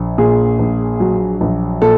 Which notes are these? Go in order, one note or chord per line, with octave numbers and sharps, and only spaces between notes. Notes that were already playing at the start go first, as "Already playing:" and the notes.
Already playing: A#1
A#2 G#4
A#1
F#3
A#1
A#2 A4